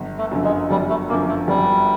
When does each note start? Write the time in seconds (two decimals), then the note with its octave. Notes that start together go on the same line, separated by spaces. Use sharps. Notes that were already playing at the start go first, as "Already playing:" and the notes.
Already playing: G1
0.18 A3
0.31 F#2 D3 F3
0.44 G#3
0.71 G1 G3
0.90 A3
1.09 F#2 D3 F3 A#3
1.29 A3
1.48 G1 G3